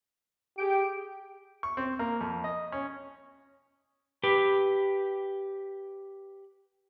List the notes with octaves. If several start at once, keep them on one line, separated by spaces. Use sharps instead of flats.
G4 G#4 G5 D7
C#6
C4
A#3
F2
D#5
C#4
G4 B4